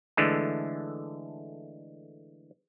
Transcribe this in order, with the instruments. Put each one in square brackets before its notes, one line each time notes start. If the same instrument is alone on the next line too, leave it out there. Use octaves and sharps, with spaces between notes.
[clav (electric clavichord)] D3 E3 G#3 A3